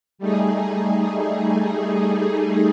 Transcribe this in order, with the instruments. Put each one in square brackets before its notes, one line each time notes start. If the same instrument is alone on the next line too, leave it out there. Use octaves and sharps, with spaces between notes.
[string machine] G3 A3 D#4 G#4